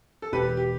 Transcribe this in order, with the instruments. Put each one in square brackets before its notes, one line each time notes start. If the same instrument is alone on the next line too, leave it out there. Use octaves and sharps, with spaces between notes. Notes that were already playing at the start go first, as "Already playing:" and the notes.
[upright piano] A4
[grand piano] E1 [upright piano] G4 B4
[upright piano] G4